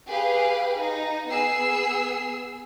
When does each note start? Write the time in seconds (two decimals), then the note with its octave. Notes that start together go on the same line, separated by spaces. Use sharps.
0.10 G4 G#4 B4 F5
0.81 D#4
1.31 B3 G#4 E6 C7